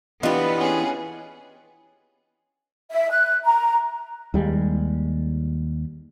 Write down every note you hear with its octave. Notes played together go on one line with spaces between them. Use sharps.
E3 B3 D4 F4 G4 B4 D#5
C#4 G#4
E5
F#6
A#5
D#2 G3 G#3